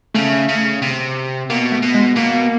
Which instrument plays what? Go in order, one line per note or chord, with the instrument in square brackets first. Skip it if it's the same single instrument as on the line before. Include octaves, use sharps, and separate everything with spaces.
[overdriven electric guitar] C#3 [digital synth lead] A3
[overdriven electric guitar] C#3
C3
[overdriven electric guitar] B2 [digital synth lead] A#3
[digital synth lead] A3
[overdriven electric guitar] B2
[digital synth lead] G#3
[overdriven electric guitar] B2 [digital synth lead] A#3